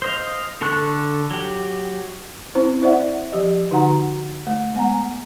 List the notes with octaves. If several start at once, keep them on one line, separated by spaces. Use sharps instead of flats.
C5 D#5 F5
D3 A4 A5 C#6 F#6
F#3 G4
C4 C#4 E4 C5
E4 C5 D5 E5 F#5
F3 G4 D#5
D3 D#4 F#4 F#5 A#5
A3
G#3 B3 F#5 G#5 A#5